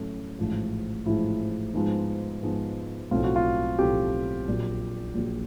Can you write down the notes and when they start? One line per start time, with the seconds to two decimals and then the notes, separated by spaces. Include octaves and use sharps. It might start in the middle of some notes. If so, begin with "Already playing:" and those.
Already playing: A2 F#3 A3 C#4
0.39 A1 G#2 F3
1.06 A1 G#2 F3 E4
1.74 G#2 F3 G#3 B3 D#4
2.42 G#2 F3 G#3 B3 D#4
3.11 B1 A2 F3 A3 C4 F4
3.24 F#4
3.36 F4
3.79 B1 A2 F3 A3 C4 G4
4.48 A#1 A#2 F#3
5.15 A#1 A#2 F#3